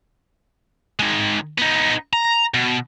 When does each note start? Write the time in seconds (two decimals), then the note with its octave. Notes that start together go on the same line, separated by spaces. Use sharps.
0.99 D#3 G#3
1.58 B3 D#4
2.13 A#5
2.54 B2